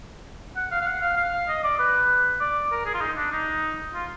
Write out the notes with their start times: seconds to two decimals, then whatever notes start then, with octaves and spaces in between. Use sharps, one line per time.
0.56 F#5
0.71 F5
0.81 F5
0.86 F#5
1.01 F5
1.17 F5
1.32 F5
1.48 D#5
1.64 D5
1.79 B4
2.40 D5
2.71 A#4
2.86 G#4
2.94 F4
3.01 D#4
3.16 D4
3.31 D#4
3.94 F4